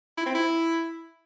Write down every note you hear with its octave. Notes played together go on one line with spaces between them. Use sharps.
E4
C4
E4